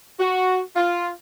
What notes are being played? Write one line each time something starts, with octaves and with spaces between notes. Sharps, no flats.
F#4
F4